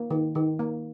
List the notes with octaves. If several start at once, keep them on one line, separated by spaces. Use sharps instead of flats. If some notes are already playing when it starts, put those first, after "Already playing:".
Already playing: A#3
D#3
D#3
A#3